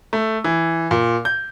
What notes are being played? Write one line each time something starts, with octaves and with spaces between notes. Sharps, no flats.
A3
E3
A#2
G6